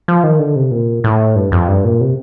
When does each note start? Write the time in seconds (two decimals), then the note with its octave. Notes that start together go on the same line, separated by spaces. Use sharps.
0.08 F3
0.23 D#3
0.39 D3
0.56 C3
0.71 A#2
1.04 A2
1.36 G2
1.52 F2
1.68 G2
1.85 A#2
2.01 C3